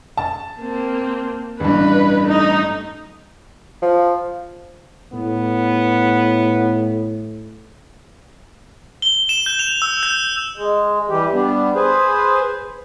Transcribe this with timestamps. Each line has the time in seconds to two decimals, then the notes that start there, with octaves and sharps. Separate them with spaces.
0.17 A5
0.59 A#3 C4
1.60 A1 G2 B4
2.24 A3 D#4
3.82 F3
5.13 A2 B3
9.02 G7
9.29 E7
9.46 G6
9.59 F7
9.82 E6
10.03 G6
10.57 G#3
11.09 E3 G3 G4
11.33 G3 B3 D4
11.75 G#4 B4 C5